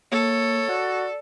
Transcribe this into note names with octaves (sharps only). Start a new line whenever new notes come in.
A#3 A4 C#5
F#4 D5